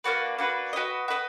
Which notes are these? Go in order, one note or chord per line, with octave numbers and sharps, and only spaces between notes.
A#3 D4 F#4 B4
A#3 D4 F#4 B4
F#4 B4 D#5
F#4 B4 D#5